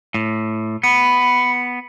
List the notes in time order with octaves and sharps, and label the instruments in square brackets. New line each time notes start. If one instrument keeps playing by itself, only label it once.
[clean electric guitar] A2
[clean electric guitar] B3 [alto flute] B5